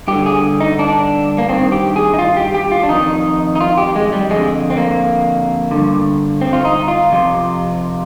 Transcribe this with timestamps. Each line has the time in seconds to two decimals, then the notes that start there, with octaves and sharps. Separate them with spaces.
0.08 G2 D3 G4
0.26 G#4
0.61 D#4
0.79 D4
1.38 A#3
1.49 G2 D#3 C4
1.72 G4
1.96 G#4
2.14 D#4
2.19 F4
2.37 G4
2.54 G4
2.72 F4
2.83 D4
2.89 F2 D#3 D#4
3.55 D#4
3.61 F4
3.78 G4
3.96 G#3
4.13 G3
4.30 F2 D3 G#3
4.70 C4
4.77 A#3
5.71 G2 D3
6.41 C4
6.53 F4
6.65 D#4
6.88 F4
7.12 F2 C3